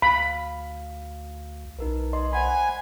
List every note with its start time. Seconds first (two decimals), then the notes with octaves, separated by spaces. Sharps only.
0.02 D2 F5 B5
1.79 B1 D#4 A#4 B4
2.13 D5 D#5 C6
2.33 C5 F#5 G#5 B5